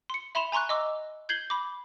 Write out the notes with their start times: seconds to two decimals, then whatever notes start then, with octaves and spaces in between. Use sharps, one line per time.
0.10 C6 C#7
0.35 E5 B5 C6 E7 F7
0.52 G#5 A#5 C6 C#6 F#6
0.69 D#5 C6 D6 E6
1.29 G6 G#6 C7 F#7 G7
1.50 B5 D6